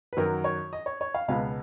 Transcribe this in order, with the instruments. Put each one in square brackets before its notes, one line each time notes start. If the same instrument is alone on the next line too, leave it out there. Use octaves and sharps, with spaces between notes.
[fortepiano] B4
F#2 D#3 F#3 A#4
C#5
D#5
C#5
C#5
F5
C#2 B2 G#3 B3 F5